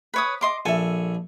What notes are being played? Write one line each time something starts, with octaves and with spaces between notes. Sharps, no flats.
B4 C#5 D#6
D#5 C6 D6
A#1 A4 E5 G#5